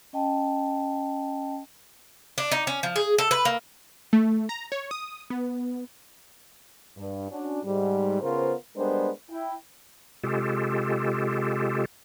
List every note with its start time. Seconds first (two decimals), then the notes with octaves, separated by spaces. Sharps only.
0.13 C#4 D#5 G5 A5
2.38 D4
2.51 D#4
2.67 C#4
2.83 F3
2.96 G#4
3.18 A4
3.31 B4
3.45 A#3
4.13 A3
4.49 A#5
4.72 C#5
4.91 D#6
5.30 B3
6.97 G2
7.31 C#4 D4 F#4
7.64 G#2 G3
8.21 C#3 B3 F4 A#4 C5
8.76 G3 G#3 B3 D4 A#4 C5
9.30 E4 G5
10.24 C3 G#3 F4 G4 A4